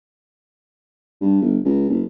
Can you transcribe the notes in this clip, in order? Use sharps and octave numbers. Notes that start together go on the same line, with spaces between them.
G2
G1
C#2
F#1